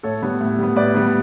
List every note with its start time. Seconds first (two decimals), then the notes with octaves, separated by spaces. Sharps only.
0.03 A2 A4 C#5
0.22 G3 B3
0.41 A2
0.58 G3 B3
0.76 A2 B4 D5
0.95 G3 B3